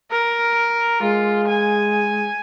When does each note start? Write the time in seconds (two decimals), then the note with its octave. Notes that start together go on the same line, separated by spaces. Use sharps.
0.11 A#4
1.02 G#3 F4
1.47 G#5